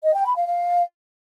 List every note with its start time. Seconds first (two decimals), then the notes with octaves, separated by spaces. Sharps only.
0.03 D#5
0.14 G5
0.25 B5
0.36 F5
0.47 F5